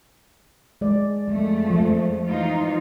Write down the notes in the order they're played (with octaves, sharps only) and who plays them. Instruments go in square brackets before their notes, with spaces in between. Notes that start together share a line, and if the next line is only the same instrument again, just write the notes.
[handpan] G#3 D5
[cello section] F2 A3 [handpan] G#3
[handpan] F3
[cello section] E3 D#4 F4